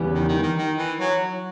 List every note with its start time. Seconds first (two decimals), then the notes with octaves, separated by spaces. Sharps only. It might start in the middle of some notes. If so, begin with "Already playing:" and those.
Already playing: E2 C#3 E3 G3 B3
0.15 D#3
0.28 D#3
0.43 D#3
0.58 D#3
0.78 E3
1.00 F#3